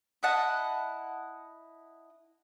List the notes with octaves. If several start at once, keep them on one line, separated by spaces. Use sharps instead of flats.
E4 D#5 F#5 A5